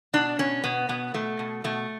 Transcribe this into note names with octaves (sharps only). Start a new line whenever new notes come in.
B2 D4
B2 C#4
B2 B3
B2 B3
B2 A3
B2
B2 A3